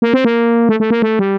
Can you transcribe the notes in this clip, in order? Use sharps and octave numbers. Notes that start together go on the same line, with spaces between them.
A#3
C4
A#3
A3
A3
A#3
A3
G3